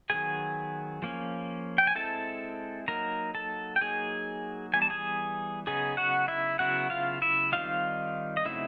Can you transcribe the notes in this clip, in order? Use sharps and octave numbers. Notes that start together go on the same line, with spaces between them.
D#3 F#3 B3 G#4 G#5
F3 A#3 C#4
G5
G#5
G#3 C4 E4 A4 A5
F#3 A#3 D#4 A#4 A#5
A4 A5
G5
F#3 A#3 D#4 G#4 G#5
E3 G3 B3 G#5
A5
G#4 G#5
C#3 F#3 B3 D#4 G#4 G#5
F#4 F#5
E4 E5
C#3 F#3 B3 E4 F#4 F#5
F4 F5
E4 E5
D#3 G3 C4 D#4 F4 F5
D#5
C#3 F#3 A3 C4 D#4 E4 E5